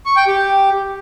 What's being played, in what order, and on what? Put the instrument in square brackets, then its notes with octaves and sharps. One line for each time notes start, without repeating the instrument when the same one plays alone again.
[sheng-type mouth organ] C#6
G5
G4